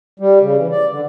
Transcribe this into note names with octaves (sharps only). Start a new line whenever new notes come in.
G3
C#3
E3
D5
D3